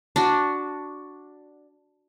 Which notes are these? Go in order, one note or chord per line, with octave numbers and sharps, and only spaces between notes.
D4 F#4